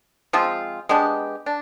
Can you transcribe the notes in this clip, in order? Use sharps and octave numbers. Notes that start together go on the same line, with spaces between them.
F3 G#3 C4 F4
G#3 B3 D4 G4
D4